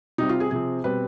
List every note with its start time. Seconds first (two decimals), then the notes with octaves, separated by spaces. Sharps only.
0.18 C3 G3 C4 D#4
0.29 F4
0.40 G#4
0.51 C3 F3 C4 G#4
0.84 B2 G3 C4 B4